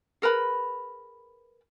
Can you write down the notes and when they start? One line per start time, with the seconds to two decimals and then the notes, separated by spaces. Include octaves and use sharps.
0.22 G#4 A#4 B4 B5